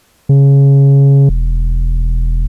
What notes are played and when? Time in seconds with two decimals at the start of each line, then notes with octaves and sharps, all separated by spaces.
0.29 C#3
1.29 E1